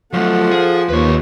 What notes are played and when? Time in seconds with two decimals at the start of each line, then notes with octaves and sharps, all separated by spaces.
0.13 F3 F#3 A3 A4 F#5
0.51 G#4
0.89 D#2 F4 B4 C#5